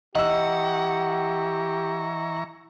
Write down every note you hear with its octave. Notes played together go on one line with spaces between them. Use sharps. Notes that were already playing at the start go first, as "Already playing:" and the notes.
E3 G4 D#5 F#5 A#5 C#6 E6